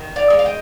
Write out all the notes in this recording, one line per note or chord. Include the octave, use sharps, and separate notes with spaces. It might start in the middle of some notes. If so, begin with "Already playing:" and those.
Already playing: D#3
D5 F5
G#3
F5
D#5 G5